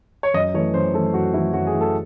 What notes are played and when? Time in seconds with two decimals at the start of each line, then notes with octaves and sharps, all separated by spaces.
0.23 C#5
0.34 F#2 D#5
0.54 E3 A3 C#5
0.74 F#2 C5
0.94 E3 A3 A4
1.14 F#2 F#4
1.34 E3 A3 E4
1.53 F#2 F#4
1.67 G#4
1.74 E3 A3
1.81 A4